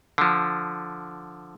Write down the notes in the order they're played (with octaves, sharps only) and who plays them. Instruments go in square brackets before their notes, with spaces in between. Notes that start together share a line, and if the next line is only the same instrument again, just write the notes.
[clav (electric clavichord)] D3 F3